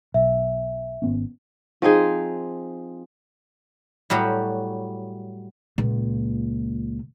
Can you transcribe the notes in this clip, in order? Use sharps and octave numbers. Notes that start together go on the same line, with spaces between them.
B1 E5
G#1 B3 C#4
F3 C4 D#4 G#4
A2 F#3 G3 F#4 G4
C#2 A#2